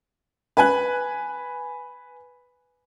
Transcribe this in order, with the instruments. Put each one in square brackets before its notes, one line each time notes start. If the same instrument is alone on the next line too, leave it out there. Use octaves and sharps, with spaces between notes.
[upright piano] B4 G#5 F#6